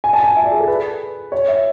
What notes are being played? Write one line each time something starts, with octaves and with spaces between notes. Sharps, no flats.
G#5
A5
G#5
E5
D5
G#4
A4
B4
C#5
E5